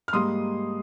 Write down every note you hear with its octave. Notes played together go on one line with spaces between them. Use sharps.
F6
G#2 G3 A#3 C6 D#6